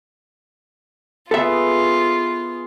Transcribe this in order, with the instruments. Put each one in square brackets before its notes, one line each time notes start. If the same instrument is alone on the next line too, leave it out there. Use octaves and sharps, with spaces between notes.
[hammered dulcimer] B3 G#4 [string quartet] F4 [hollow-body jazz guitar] A4 E5